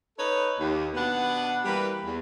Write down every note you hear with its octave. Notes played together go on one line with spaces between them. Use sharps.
D#4 A4 B4 C#5
D#2
B2 B3 D4 B4 F#5
E3 G3 A#3 B4
E2